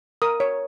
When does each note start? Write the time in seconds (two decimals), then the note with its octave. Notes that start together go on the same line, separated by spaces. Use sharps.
0.22 A#4 D#6
0.40 C#5